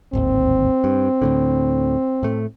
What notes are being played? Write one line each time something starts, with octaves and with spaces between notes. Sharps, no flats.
D1 G#1 D#2 C4
G2
D2 A2 D3
A2 A3